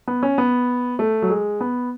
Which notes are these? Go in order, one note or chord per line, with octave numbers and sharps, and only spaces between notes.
B3
C#4
B3
A3
F#3
G#3
B3